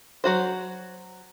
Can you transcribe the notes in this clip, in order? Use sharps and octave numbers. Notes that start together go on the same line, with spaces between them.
F#3 F#4 C5